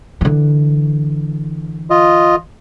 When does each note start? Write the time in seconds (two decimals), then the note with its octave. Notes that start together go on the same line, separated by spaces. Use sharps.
0.21 D3 E3
1.90 F4 D#5